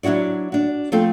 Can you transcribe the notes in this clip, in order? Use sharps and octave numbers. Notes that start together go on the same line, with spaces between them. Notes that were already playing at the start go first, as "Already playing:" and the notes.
F#3 D4 E4 F#4 D5
D4 F#4
F3 A3 C4 A4 G5